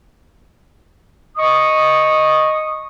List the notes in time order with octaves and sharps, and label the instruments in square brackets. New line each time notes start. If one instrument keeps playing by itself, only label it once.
[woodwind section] D#5 C#6 D#6